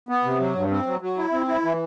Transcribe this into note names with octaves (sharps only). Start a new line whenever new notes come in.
B3
C3
F#3
G2
C4
F#3
F#3
E4
C4
E4
E3